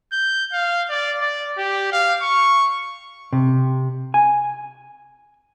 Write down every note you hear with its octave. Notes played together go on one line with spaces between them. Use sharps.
G6
F5
D5
D5
G4
F5
C#6
C3
G#5